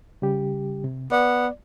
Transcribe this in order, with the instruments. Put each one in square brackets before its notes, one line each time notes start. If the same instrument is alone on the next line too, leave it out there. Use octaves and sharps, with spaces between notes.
[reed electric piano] C#3 G3 G4
C3
[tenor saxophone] B3 [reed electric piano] D5